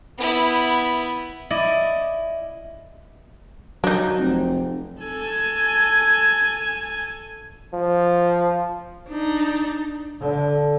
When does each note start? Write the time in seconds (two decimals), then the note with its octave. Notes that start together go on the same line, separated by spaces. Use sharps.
0.18 B3 E4
1.50 E4 D5 D#5
3.84 F#3 D4 D#4
4.18 F1 C4
5.03 A4 G#5
7.74 F3
9.09 D4 D#4
10.21 D3